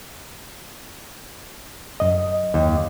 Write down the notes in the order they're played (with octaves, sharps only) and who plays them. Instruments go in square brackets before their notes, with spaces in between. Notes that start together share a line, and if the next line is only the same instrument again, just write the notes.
[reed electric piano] F#2 D#5
[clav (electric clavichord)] D#2